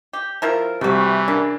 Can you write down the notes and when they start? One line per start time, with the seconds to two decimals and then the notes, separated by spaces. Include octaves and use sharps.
0.13 G4
0.42 F3 E4 A#4
0.81 C3 E3 G3 A3 F#4
1.28 C#3 D4 A#4